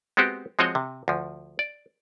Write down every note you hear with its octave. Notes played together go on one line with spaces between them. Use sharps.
G#3 B3 C4 F#4 G4
F3 G#3 C4 F#4 C#5 D#5
C3
D2 F3
D5